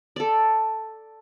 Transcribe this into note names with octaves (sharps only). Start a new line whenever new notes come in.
A4 D5